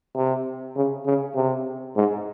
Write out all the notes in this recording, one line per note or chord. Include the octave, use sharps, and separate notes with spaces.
C3
C#3
C#3
C3
G#2